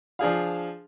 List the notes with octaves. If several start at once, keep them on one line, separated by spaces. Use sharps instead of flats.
F3 D4 G#4 F5